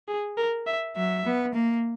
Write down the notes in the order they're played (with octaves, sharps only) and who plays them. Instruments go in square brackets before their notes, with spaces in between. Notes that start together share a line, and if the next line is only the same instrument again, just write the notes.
[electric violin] G#4
A#4
E5
[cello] F#3 [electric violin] E5
[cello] B3
A#3